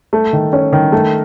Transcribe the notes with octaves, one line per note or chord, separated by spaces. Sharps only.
A3
D#3
C#4
D#3
A3